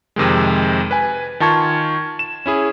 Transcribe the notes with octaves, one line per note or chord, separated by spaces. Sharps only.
F2 C3 D#3 G#3
B4 G#5
D#3 F4 A5 C#6 G#6
E7
C#4 E4 G#4